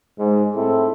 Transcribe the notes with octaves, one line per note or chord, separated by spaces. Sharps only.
G#2
A2 C4 E4 A4